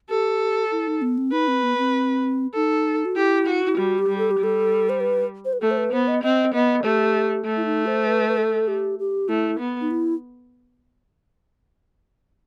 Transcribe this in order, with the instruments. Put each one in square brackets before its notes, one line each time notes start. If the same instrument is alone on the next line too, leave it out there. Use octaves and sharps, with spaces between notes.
[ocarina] G4 [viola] A4
[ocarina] E4
D#4
B3
C4
[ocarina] D#4 [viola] B4
[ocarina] C4
B3
C4
[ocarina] D#4 [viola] A4
[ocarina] F#4
[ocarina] E4 [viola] G4
[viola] F#4
[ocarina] E4
[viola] G3 [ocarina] F#4
[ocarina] G4
[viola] G3
[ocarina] A4
G4
[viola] G3 [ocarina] A4
[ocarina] C5
B4
C5
B4
[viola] A3 [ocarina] A4
[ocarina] C5
B4
[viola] B3 [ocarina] C5
[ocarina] D#5
[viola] C4 [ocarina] D#5
[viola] B3 [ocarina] D#5
[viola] A3 [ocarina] G4
[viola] A3
[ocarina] E4
D#4
C5
B4
B4
A4
G4
G4
[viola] A3 [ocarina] E4
[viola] B3
[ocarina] D#4
E4